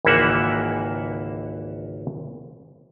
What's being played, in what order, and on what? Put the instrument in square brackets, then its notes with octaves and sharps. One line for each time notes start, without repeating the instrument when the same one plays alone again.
[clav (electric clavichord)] G#1 C#2 E3 A#3 E5 F#5